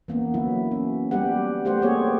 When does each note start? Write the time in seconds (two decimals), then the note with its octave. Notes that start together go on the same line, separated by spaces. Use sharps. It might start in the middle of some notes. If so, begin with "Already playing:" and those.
0.08 E3 A#3 B3 C#4
0.34 D3 F#3 E4
0.72 C#4
1.11 G3 B3 G4 B4 F#5
1.65 A3 G4 C5 F#5
1.82 A#3 C4 G4 G#4 C#5